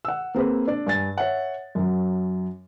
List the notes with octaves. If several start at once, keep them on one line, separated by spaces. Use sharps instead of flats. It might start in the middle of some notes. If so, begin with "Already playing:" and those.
F#5 E6
A#3 C4 G#4 B4
D4 D5
G2 G#5 A6
C#5 E5 F#5
F#2 F#3